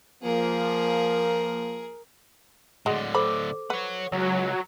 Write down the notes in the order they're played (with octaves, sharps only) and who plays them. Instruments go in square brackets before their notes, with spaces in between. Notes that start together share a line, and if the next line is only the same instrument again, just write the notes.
[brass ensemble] F3 A#3 [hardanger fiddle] G#4 A#4
[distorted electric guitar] A2 D3 [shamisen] G#3 F#4
[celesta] A4 C5 D6 [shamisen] B5
[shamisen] B4 [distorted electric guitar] C#5 F#5
[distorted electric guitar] C#2 [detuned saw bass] F#3